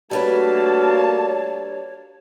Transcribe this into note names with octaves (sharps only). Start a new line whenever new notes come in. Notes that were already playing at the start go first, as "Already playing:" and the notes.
G3 A3 A#3 D4 F#4 B4 C#5 A5